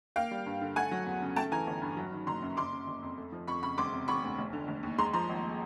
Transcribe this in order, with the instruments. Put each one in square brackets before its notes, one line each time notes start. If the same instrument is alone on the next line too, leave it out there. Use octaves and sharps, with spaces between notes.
[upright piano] A#3 F5 G5
G3
G2
D3
A3 F#5 G#5
F#3
E2
C#3
A3 G5 A5
E3 G#5 A#5
G1
G2
F#3
D#3
F#1 A#5 C6
F#2
F#1 C6 D6
C#3
F#1
F2
A3
F3
F2 B5 C#6
C#3 B5 C#6
E1 C6 D6
C3
E1 B5 C#6
D2
F1
D3
F1
D#2
G#3 A#5 C6
F3 A#5 C6
G#1